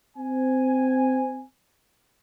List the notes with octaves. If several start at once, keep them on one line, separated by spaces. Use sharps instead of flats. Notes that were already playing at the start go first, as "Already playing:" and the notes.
C4 G#5